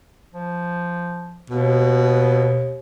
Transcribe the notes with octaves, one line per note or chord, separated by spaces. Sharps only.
F3
D#2 B2